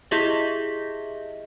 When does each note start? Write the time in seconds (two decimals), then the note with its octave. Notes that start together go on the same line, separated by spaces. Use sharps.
0.11 E4 G4 G#4 D#5 E5